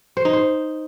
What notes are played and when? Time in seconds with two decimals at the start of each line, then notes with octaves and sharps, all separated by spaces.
0.17 C5
0.25 D#4
0.33 C5